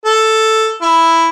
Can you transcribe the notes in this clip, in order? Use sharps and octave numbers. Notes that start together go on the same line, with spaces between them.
A4
E4